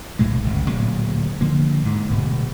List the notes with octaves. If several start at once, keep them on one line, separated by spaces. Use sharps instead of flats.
B1 A2 C3 G#3
G1 C#2
D1 D2 A#2 F#3
D3 F3 A#3
G#2
D1 B2